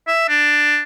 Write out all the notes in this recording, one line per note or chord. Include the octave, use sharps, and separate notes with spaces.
E5
D4